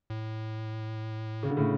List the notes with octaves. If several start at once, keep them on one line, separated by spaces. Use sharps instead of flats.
A2
C#3
D3
A2 C#3